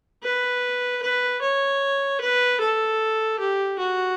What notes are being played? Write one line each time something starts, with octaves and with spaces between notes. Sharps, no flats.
B4
B4
C#5
B4
A4
G4
F#4